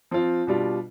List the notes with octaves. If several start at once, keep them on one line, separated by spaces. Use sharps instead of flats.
F3 C4 F4
B2 G3 D4 F4